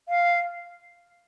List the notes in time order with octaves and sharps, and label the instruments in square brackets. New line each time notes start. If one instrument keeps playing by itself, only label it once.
[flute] F5